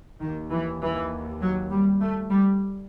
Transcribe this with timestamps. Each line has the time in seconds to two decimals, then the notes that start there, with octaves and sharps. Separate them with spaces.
0.21 D#2 D#3
0.52 E3
0.81 E3
1.41 F#3
1.71 G3
2.01 A3
2.31 G3